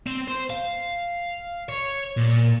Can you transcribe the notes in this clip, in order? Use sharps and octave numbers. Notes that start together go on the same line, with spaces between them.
C4
C5
F5
C#5
A#2